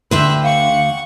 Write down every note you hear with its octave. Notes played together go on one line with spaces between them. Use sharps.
D2 D3 D4 B4 E5 G5 C6 F#6
F5 F#5 C#6